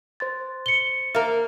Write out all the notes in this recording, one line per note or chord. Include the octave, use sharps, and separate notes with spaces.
C5 C6 A6
C#7 G7
A#3 A#4 E5